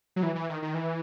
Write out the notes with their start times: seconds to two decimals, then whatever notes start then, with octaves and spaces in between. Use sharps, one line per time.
0.16 F#3
0.23 E3
0.35 E3
0.49 D#3
0.62 D#3
0.74 E3